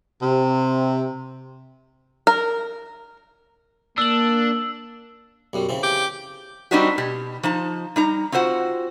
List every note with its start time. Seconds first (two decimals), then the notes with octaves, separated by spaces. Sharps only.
0.22 C3
2.27 A#4
3.98 A#3 D4 E6 F#7
5.53 B1 F#2 G3
5.69 C#3 E3 C4
5.83 G4
6.71 G3 C4 D4 D#4 F#4 G4
6.98 B2 G4
7.43 F3 D#4 A5
7.96 G3 D#4 A#5
8.32 C4 F4 F#4 C5 F#5